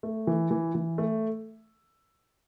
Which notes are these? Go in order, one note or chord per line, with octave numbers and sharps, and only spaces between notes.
A3
E3
E3
E3
A3